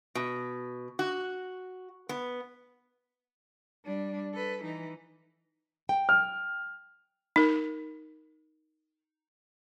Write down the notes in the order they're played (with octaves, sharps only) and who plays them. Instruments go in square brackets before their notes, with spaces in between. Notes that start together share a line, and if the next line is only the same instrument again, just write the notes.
[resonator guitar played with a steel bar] B2
F#4
B3
[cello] G3 D4
A4 B4
E3 D#4
[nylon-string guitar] G5
[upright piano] F6
[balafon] D#4 A#4